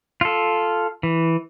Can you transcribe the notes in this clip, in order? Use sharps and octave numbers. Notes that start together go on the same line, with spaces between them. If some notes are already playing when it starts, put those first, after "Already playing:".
F4 A4
E3